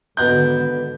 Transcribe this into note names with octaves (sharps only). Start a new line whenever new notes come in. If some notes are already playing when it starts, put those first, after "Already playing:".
G#1 B2 D3 D#4 B5 G6